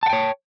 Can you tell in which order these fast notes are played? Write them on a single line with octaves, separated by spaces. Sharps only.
A5 F#5 G5 C#5